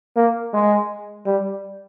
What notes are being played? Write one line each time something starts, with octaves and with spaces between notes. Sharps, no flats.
A#3
G#3
G3